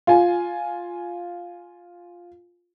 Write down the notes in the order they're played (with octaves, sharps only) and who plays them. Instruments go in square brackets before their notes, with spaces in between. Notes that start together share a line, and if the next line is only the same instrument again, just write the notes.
[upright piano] F4 G#5